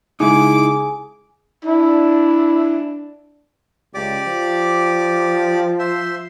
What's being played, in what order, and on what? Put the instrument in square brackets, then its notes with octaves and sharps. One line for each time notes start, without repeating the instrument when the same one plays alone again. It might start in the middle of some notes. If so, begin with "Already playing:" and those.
[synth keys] C#3 G#3 [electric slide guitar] D#4 E4 [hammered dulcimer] G#4 [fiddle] D6
[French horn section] D4 [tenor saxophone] E4
[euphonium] C#2 [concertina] G4 D5 D6
[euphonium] F3
[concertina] C5 E5 C6